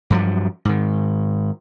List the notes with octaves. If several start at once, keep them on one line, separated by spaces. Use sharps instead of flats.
G2 F3 F#3
G#2 D#3